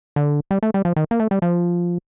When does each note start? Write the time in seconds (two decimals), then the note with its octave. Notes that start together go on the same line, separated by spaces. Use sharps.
0.16 D3
0.51 G3
0.63 A3
0.74 G3
0.85 F3
0.96 D#3
1.11 A#3
1.20 A3
1.31 G3
1.42 F3